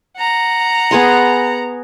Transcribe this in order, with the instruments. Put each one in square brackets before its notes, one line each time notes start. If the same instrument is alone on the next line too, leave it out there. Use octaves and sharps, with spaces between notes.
[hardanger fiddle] F#5 A#5
[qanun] B3 G#4 C6